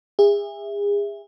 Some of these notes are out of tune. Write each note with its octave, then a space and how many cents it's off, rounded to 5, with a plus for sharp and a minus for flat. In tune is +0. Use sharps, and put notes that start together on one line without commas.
G#4 -35 E5 +0